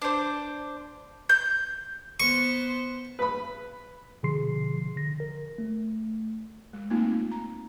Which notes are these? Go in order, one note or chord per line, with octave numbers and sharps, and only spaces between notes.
D4 C5
G6
B3 C5 C#6
B4 B5
B2 D3 F3 G#4 C6 C7
D3 A#6
A#4
A3
G#3
A3 A#3 C4 D#4 F4
A#5